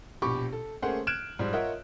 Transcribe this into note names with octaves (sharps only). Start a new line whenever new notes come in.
A#1 B2 G4 B5 C#6 D6
A4
A3 A#3 C#4 G#4 C5 F#5
F6 F#6 G#6 D7 E7
G#2 F3 G3
F4 A#4 C#5 D#5 E5 F#5